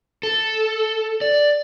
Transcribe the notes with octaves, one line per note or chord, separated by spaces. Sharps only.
A4
D5